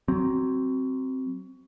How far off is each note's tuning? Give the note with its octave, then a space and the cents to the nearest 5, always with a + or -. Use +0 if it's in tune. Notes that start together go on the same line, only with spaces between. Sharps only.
F#3 +20 C4 +5